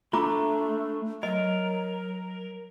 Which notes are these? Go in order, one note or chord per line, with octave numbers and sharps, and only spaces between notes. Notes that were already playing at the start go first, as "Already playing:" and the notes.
A3 D4 F4 A#5 D6
F#3 A#4 D#5